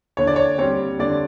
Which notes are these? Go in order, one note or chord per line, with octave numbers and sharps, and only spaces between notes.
D3 C#5
D5
C#5
G3 C4 C#5
D3 D5